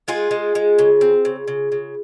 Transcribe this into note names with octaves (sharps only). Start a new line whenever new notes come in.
G#3 F4 G#4
G#3
G#3
C#3
C4
C#3
C#3
C#3